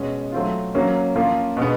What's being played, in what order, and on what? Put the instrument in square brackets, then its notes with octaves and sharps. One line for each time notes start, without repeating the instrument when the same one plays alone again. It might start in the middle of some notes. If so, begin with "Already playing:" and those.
Already playing: [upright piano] B2 G#3 C#4
F#3 A3 C4 F4
F#3 A#3 C#4
F3 A#3 C#4 F4
B2 G#3 B3